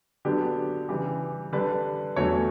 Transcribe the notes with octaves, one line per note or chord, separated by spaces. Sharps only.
D3 F#3 B3 D4 G4
C#3 E3 G3 G4
D3 G3 D4 B4
E2 D3 F#3 A3 C#5